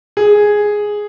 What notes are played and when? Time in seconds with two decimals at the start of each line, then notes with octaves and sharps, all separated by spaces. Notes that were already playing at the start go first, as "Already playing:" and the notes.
0.17 G#4